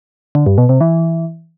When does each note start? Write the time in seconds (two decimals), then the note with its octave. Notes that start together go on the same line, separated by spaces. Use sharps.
0.35 D3
0.46 G2
0.58 B2
0.69 C3
0.81 E3